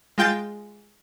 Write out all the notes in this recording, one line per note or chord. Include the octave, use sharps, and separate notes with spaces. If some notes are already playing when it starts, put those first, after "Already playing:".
G#3 F4 G5 G6 A6